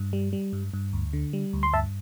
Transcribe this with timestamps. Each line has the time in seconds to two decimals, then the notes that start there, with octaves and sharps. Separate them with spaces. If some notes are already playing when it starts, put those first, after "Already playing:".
Already playing: G2
0.13 G3
0.33 G3
0.53 G2
0.74 G2
0.93 D2
1.13 D3
1.33 G3
1.53 D2
1.63 C6
1.73 G2 E5 A5